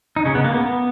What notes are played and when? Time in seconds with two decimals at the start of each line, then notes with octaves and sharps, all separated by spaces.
0.16 D#4
0.25 C#3 C#4
0.35 B3
0.44 A#3
0.54 B3